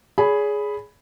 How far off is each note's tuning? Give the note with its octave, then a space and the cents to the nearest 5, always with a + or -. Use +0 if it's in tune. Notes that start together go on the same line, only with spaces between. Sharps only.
G#4 +5 C#5 +45 B5 +0